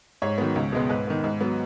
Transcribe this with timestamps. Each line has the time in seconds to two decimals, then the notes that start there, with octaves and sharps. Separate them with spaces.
0.22 G#2 C#5
0.38 D#3 F#3 B3
0.56 C#2
0.72 B2 G#3 B3
0.89 G#2 B4
1.07 D#3 B3
1.24 G#2
1.41 F#3 B3